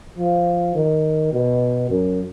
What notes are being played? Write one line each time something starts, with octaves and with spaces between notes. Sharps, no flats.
F3
D#3
B2
F#2